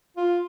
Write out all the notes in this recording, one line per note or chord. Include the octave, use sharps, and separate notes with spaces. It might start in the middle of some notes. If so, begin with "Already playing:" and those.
F4